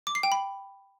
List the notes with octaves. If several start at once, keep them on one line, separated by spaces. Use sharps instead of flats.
D6
C7
G5
B5